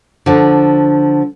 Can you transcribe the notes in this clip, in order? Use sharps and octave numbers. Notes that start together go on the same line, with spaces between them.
D3 F3